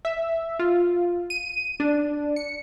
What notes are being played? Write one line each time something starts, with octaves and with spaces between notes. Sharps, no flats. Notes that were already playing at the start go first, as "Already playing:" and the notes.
E5
F4
D#7
D4
C#7